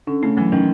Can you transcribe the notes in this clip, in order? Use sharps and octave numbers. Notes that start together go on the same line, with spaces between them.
D3 C#4
C#3 A3
E3 F#3
D#3 C#4